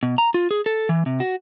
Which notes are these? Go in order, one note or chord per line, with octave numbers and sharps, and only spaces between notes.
B2
A#5
F4
G#4
A4
E3
C3
F#4